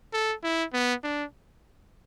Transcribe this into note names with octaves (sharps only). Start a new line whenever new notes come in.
A4
E4
B3
D4